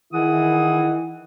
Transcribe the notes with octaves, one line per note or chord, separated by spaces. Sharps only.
D#3 E3 E4 G#4 F#5 D#6